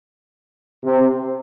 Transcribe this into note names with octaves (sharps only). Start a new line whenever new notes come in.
C3